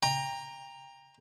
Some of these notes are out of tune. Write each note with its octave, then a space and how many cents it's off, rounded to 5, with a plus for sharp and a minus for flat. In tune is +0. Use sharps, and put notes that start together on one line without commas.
G5 +30 A#5 +0